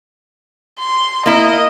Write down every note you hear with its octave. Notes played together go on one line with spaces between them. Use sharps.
C6
A#3 E4 D#5